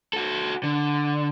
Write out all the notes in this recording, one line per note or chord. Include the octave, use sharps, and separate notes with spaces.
F#4 A4
D3